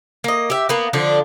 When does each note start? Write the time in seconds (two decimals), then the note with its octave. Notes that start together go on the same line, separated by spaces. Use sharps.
0.24 A#3 D#5
0.50 G4 E5
0.69 A#3 B3
0.93 D3 F3 D4